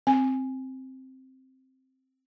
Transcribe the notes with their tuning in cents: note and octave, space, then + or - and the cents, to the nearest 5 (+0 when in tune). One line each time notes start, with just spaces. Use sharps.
C4 +0 G#5 +0